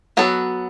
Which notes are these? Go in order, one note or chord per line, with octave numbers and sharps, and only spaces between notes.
F#3 B3 F#4 A4